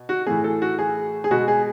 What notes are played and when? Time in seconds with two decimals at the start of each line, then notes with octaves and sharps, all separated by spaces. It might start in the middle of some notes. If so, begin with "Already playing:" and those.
Already playing: B2
0.09 F#4
0.27 A2 E3 A3 G#4
0.44 A4
0.62 F#4
0.79 G#4
1.24 G#4
1.31 B2 G#3 F#4
1.48 G#4